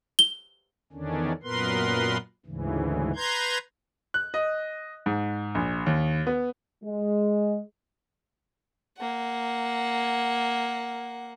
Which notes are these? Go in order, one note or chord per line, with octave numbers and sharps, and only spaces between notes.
G7
E2 D3 D#3 C#4 D4
F#2 A#2 B3 A#4 B4 C6
D2 G#2 C#3 E3
B4 A#5 C6 G6 G#6
F#6
D#5
G#2
A#1
D#2
B3
G#3
A#3 F#5